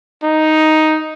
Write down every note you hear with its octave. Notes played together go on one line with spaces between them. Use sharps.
D#4